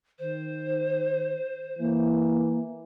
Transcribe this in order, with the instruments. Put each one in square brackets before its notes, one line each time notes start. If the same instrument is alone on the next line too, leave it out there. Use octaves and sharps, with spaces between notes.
[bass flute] D#3 [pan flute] C5
[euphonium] E3 [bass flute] A#3